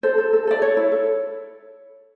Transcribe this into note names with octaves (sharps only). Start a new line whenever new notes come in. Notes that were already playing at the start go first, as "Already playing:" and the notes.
A4 C5
A4
A4
A4 D5
A4 C#5
E4
A4